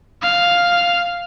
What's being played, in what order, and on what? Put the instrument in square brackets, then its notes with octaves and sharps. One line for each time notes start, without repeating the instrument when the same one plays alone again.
[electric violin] F5